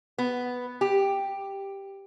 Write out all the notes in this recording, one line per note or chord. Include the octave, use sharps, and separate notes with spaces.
B3
G4